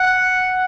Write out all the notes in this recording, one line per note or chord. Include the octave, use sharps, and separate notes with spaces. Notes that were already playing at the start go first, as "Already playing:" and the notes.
Already playing: F#5